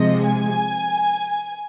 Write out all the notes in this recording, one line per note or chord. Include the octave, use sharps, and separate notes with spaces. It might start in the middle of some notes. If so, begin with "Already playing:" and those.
Already playing: C3 F3 G#3 D#5
G#5